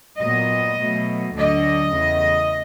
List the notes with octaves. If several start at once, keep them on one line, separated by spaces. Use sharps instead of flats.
A#2 F#3 B3 D#5
B2 F#3 A3
D2 D3 F#3 D#5
E2 C#3 E3 A3